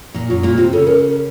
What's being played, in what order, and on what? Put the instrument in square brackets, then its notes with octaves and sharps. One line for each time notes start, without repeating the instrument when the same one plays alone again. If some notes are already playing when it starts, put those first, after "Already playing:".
[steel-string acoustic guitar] A#2 A#3
[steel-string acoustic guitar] F#2 F#3 [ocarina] F4
[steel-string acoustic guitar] A#2 A#3 [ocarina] F4
[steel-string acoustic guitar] C3 C4 [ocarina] F4
[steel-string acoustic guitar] C#3 C#4 [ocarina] A4
[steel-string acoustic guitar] C#3 C#4 [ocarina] A#4
[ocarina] A#4